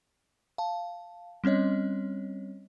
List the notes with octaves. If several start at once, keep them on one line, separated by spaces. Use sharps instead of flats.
F5 A5
G3 C4 C#4 C#5 D#5